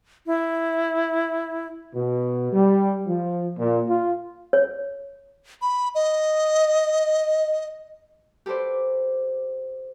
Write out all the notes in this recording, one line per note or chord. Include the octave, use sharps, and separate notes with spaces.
E4
B2
G3
F3
A#2
F4
C#5
B5
D#5
G4 A4 B4 C5 D5